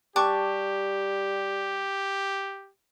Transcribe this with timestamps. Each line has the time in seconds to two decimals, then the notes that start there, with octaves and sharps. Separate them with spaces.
0.16 G3 G4 G5 A5 C#6 D6 F#6